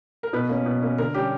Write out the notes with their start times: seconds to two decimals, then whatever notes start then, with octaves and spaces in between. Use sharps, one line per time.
0.23 A#4
0.33 B2 B4
0.49 A#3 C#4
0.66 B2
0.82 A#3 C#4
0.98 D3 A#4
1.14 G3 C#4 G4